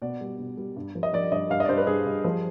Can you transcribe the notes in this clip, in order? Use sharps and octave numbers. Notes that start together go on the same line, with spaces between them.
B2 D5
G3
B2
G3
G2
F3
D#5
F3 D5
G2 D#5
G2 F5
D#5
D5
G2 C5
B4
G2 G#4
G2
F3